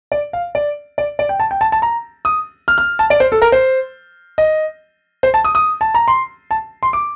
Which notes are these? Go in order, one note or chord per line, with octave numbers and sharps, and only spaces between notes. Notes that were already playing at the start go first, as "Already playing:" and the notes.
D5
F5
D5
D5
D5
G5
A5
G5
A5
A5
A#5
D#6
F6
F6
A5
D5
C5
A4
A#4
C5
D#5
C5
A5
D#6
D#6
A5
A#5
C6
A5
C6
D6